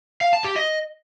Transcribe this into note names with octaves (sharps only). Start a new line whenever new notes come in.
F5
A5
G4
D#5